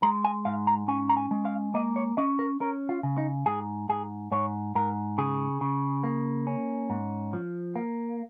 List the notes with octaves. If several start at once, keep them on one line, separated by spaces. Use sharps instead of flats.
G#3 A#5
G#5
G#2 F5
A#5
C#4 G#5
A#5
G#5
G#3
F5
A#3 D#5
C#5
C#4 D#5
A#4
C#4 A#4
F4
C#3
D#4
G#2 G#4
G#2 G#4
G#2 C#5
G#2 A#4
C#3 G#4
C#3
A#3
C#4
G#2
F3
A#3